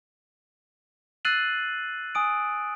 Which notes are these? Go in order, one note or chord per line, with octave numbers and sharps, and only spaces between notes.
E6 F#6 A6 C7 D#7 F#7
G#5 D#6 D7